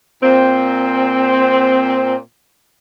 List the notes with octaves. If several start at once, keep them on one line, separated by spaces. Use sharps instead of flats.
A#2 C4